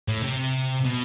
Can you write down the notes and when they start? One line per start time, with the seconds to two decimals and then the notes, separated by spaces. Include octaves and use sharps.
0.08 A2
0.23 C3
0.85 B2